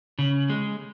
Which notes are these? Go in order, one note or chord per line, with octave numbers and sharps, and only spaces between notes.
C#3
G#3